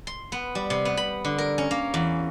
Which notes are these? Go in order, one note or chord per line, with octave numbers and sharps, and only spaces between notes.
C6
B3
G3
C3
B3
B5
D3
A#4
C#4
A#3
E2